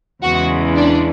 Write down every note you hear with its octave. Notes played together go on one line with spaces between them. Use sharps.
E2 C#3 E3 G#3 F#4
D4